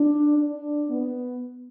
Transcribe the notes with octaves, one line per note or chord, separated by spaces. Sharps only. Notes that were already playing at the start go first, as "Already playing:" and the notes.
Already playing: D4
D4
B3